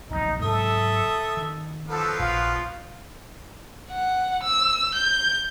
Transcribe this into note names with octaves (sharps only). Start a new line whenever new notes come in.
D1 A#1 C3 D#4
G#2 C3 F#3 A4 E5 D#6
D#3
F3 F#3 B3 A4
A#1 F4
F#5
E6
G6